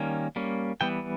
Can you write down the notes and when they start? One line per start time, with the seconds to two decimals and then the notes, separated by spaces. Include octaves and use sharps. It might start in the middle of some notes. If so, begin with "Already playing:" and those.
Already playing: D#3 G3 A#3 C#4
0.36 G3 A#3 C#4
0.81 E3 G3 B3 G5